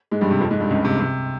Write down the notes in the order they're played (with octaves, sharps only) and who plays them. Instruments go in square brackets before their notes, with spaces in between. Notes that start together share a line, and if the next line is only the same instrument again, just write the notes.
[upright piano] G#2 G#3
G2 G3
C3
F2 F3
G#2 G#3
G2 G3
C#2 C#3
C3
C3